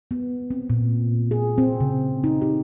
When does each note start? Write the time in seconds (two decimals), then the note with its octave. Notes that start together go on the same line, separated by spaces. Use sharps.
0.11 B3
0.50 C4
0.70 A#2
1.31 G#4
1.58 C4
1.80 C#3
2.24 D#4
2.42 G4